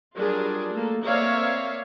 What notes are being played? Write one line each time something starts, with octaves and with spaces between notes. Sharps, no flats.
F#3 G3 D4 F4 G#4 A#4
A3 A#3 A4
A#3 C4 C#5 D5 E5 F5